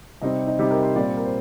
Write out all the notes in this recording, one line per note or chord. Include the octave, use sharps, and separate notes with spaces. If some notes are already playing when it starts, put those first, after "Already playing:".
C3 G3 C4 D#4 D#5
D#4
C3 G3 C4 D#4 G4
A#4
C5
A#2 G3 C4 D5
A#4
C5